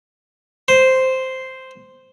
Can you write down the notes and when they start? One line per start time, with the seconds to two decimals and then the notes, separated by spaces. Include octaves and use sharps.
0.68 C5